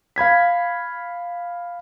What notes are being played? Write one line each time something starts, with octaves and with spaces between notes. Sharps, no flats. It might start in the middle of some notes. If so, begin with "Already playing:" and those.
F5 B5 G#6 B6